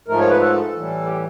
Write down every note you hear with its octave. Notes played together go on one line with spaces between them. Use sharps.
G#2 F3 A3 A#4
C#5
B4
A4
A2 E3 G3
G4